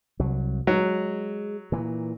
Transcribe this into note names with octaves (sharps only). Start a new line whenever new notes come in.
C2 F#3
F#3 G#3
A#2 E3